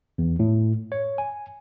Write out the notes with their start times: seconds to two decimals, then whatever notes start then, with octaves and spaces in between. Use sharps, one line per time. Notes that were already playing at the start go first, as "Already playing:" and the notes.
0.18 E2
0.39 A2
0.92 C#5
1.18 G#5